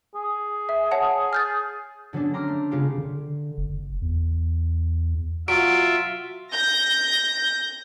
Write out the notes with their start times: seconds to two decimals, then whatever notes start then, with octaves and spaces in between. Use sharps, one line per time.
0.15 G#4
0.69 E5
0.91 C#5 F#5 A5
1.33 F6 G6 A6
2.13 D3 F#3 B3 C#4 D4
2.33 G5 A#5 C6 D6 F6
2.48 A3
2.71 C#3 G#3 B3 F4 G4
2.98 D3
3.58 F#1
4.02 E2
5.48 F#3 F4 E5 D7
6.53 G6 A#6